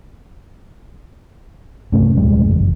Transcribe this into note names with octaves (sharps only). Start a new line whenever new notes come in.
G2 C3 A3 C#4
D#1 G3 G#3
F#1 E2